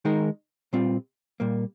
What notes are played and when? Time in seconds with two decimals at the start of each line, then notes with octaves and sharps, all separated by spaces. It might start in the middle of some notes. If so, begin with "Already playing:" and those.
0.05 D#3 G#3 D#4 A#4
0.73 A#2 G3 C4 F4
1.40 A#2 G3 A#3